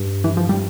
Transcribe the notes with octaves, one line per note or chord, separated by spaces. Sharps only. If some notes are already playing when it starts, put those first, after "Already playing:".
Already playing: G2
E3
F3
G3